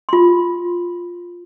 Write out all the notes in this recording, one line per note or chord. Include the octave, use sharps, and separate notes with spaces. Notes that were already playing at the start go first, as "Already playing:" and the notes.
F4 C6